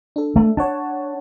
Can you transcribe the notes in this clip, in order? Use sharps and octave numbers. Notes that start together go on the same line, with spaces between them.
D4 A4
A3
D4 C#5 F#5 A5